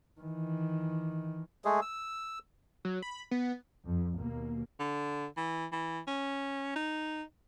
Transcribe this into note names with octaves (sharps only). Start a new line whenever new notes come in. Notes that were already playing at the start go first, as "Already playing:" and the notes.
D#3 E3
G#3 A3 G#4
E6
F#3
B5
B3
F2
D#2 B2 A#3
D3
E3
E3
C#4
D#4